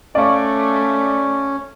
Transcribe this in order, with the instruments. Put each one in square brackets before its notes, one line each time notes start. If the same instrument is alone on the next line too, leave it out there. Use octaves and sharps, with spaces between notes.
[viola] A3 [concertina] C#4 [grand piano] D5 F5 C#6